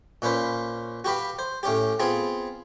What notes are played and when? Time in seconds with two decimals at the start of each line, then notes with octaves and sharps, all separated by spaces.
0.22 A#2 C#4 B4 C5
1.05 F#4 G4 B4 F5 B5
1.39 C5
1.63 A2 C#4 G4
2.00 B3 C4 F4 G#4